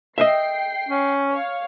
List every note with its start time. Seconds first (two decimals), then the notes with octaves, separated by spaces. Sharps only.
0.18 D#5 E5 G5 C7
0.89 C#4
1.30 C#5 F5